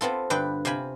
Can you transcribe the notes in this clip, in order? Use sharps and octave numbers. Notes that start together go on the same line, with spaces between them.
B3 C4 F4 A4
G2 D3 B4 G5
C3 F5 G5 G#5 B5